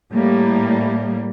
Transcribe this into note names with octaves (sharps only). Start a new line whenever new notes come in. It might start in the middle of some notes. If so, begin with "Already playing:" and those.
A2 G3 A#3